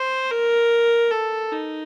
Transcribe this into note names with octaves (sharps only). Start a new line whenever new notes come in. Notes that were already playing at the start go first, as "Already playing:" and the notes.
Already playing: C5
A#4
A4
D#4